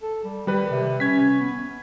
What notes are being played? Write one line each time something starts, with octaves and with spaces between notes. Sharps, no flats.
A4
G3
D#3 G3 B4
C3
C#4 G#6 B6
B3